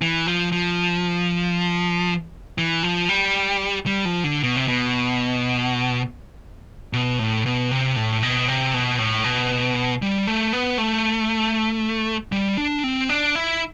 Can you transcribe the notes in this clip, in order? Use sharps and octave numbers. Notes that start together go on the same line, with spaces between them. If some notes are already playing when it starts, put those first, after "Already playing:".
E3
F3
F3
E3
F3
G3
G3
F3
D3
B2
C3
B2
B2
A2
B2
C3
A2
B2
C3
B2
A2
B2
G3
A3
B3
A3
G3
D4
C4
D4
E4